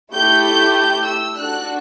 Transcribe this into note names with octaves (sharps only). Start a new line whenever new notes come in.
A3 E4 G4 G6
G6
G6
E6
D4 F#4 A4 F#6